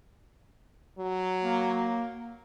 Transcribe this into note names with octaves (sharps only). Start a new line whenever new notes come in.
F#3
A#3